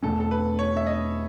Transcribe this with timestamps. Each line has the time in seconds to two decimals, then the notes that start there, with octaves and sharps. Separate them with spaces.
0.03 E2 B2 A3 C#4 A4
0.20 A4
0.31 B4
0.59 C#5
0.77 E5
0.87 D#5